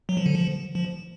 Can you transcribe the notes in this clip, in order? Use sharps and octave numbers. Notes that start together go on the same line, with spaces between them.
F#3
F3
D3
F3
F3